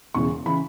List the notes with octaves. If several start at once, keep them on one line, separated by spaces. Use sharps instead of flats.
E1 E2 C#3 E3 C#6
C#3 E3 B5